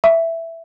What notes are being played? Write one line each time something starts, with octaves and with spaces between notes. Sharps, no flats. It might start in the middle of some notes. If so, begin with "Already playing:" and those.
E5